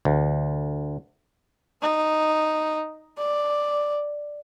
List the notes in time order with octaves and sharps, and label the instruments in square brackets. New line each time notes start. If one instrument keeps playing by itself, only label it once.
[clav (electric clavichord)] D2
[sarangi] D#4
D5